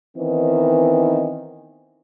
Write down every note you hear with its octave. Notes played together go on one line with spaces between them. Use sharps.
D#3 E3 B3 C4 D#4